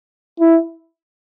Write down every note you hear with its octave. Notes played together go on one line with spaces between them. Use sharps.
E4